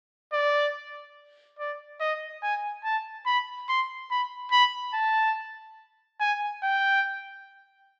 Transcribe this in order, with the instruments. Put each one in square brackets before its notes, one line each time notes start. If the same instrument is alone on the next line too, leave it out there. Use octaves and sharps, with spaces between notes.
[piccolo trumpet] D5
D5
D#5
G#5
A5
B5
C6
B5
B5
A5
G#5
G5